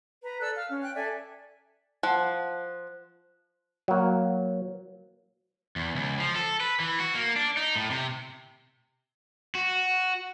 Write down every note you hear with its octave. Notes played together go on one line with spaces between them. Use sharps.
B4 A#5
A4 D5 E6 F#6
F5 F6
C#4
G5 F#6
A4 D5 E5 G#5
F3 F#5 A5 F#6
F#3 A#3
E2
C#2
F3
A4
B4
E3
F#4
A#3
D4
D#4
A2
C3
F#4